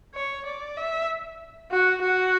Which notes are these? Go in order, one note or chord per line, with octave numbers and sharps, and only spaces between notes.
C#5
D5
E5
F#4
F#4